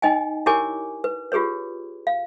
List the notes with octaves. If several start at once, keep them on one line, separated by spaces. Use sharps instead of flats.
D#4 D#5 G5 G#5
E4 G4 A#4 C#5 G#5 D6
B4
F4 G4 G#4 B4 C#5
F5